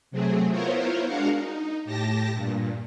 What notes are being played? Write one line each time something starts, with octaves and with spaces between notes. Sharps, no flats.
C3 F#3 A3 C4 G#4
B3 E4 F4 A#4 C5 C#5
G#3 D4 F#4 A#4 F5 F#5
D#4
A2 G4 A5 A#6
G2 A#2